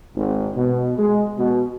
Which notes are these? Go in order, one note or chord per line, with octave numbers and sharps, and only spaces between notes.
G#1
B2
G#3
B2